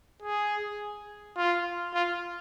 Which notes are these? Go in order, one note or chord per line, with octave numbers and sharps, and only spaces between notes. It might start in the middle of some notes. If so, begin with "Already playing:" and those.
G#4
F4
F4